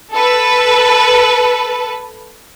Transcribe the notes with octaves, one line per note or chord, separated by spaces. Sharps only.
A4 B4